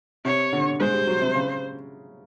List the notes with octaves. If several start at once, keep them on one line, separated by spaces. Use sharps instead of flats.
C3 C#5
D3
G#3 C5
G3
F#3
C3
C#3